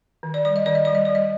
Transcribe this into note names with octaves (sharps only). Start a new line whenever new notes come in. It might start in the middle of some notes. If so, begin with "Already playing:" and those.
D#3
D5
G3 D5
D#5
D#3 D5
D#5
G3 D5
D#5
G3 D5
D#5